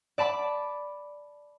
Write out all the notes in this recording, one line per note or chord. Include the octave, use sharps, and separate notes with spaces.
D5 A5 B5 D6